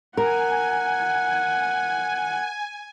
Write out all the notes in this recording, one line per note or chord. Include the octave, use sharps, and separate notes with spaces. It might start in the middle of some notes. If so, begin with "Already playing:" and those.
A#4 F#5 G#5